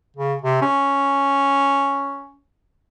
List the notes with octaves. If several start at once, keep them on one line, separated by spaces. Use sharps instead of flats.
C#3
C3
C#4